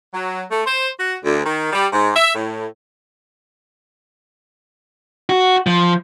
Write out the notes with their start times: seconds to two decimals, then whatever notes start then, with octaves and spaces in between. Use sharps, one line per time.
0.13 F#3
0.50 A3
0.65 C5
0.99 F#4
1.24 D2
1.45 D#3
1.72 G3
1.92 G#2
2.16 E5
2.35 A2
5.29 F#4
5.67 F3